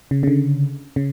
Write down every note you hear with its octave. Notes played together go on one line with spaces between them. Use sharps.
C#3
C#3
D3
C#3